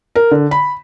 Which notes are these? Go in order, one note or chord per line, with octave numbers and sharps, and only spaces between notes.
A#4
D3
B5